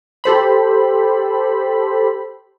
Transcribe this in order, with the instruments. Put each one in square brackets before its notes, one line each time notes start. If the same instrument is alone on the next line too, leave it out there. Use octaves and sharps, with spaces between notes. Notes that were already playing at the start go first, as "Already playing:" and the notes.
[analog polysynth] G4 A4 C5 B5